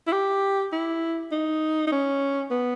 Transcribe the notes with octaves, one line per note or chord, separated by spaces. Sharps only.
E4
G4
E4
D#4
D#4
C#4
B3